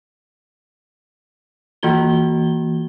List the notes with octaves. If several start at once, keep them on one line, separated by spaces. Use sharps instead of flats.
E3 A#3 F4 F#4 G7